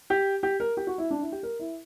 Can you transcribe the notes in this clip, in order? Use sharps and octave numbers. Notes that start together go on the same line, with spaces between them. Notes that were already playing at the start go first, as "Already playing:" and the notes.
G4
G4
A#4
G4
F#4
E4
D4
E4
G4
A#4
E4